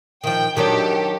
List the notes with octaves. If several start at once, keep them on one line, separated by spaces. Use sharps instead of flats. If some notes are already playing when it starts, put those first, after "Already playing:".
D#3 F3 G5
D#3 F#3 D4 G4 A4